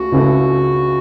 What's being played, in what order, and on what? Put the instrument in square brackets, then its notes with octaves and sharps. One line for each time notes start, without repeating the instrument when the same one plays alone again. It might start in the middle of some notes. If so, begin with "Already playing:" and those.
Already playing: [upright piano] C#2 C#3 A3 [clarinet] F#4
[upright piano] C#2 C#3 A3 E4 A4